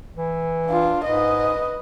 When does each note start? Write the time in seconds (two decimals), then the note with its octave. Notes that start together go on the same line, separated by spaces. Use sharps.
0.16 E3
0.66 D4 F4
1.04 G#2 B4 D#5